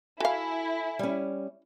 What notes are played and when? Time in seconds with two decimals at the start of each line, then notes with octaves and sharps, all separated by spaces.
0.20 E4 F#4 A4 F5 G#5
0.99 G3 C#4